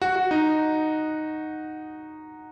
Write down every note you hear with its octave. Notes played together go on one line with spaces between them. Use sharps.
F#4
F#4
D#4